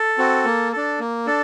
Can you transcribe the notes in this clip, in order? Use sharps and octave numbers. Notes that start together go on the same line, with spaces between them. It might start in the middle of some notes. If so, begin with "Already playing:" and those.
Already playing: A4
C4 F#4
A#3
D4 A4
A#3
D4 A4